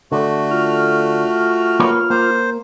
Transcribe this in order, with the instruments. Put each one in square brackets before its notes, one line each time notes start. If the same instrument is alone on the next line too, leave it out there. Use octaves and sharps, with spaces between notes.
[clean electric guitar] D3 [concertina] A3 F#4
[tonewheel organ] F4 F6
[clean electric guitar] A#3 B4 C#5
[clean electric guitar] A#3 [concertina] C5